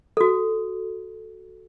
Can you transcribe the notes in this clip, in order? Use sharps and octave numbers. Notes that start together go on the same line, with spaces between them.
F#4 A4